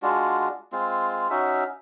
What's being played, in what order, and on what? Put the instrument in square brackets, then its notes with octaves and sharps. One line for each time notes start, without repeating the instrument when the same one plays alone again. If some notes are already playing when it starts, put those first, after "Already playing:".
[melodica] G#3 D4 F4 F#4
G#3 C4 F4
C#4 D#4 F#4 E5